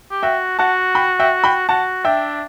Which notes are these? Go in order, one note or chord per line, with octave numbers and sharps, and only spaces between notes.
G4
F#4 E5 G5
F#4 F#5 A5
G5 B5
E5 G5
G5 B5
F#4 F#5 A5
D4 E5 G5